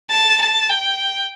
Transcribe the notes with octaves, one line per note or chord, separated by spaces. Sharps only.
A5
A5
G5